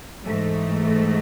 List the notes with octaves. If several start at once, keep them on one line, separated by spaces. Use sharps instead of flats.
G#2 E3 A3